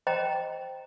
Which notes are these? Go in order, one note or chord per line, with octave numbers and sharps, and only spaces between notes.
C5 D#5 G5 A#5